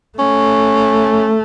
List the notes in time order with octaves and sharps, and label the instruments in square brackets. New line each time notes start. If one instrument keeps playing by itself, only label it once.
[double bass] A3 [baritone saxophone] C#4